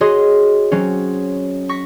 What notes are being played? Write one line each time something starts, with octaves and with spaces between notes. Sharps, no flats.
F#4 G#4 C#5 D#5 C6 D#6
F#3 C4 C#4
C#6 A#6 B6